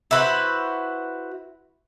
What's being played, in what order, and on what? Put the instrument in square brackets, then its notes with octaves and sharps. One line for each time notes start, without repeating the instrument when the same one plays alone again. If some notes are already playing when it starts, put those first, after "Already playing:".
[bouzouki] E4 F#4 B4 C5